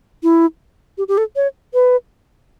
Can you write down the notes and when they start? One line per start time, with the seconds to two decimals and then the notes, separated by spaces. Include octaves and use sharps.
0.23 E4
0.98 G4
1.08 G4
1.18 A4
1.36 C#5
1.74 B4